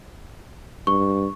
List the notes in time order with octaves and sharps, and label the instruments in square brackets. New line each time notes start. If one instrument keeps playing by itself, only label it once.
[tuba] G2 [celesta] C#6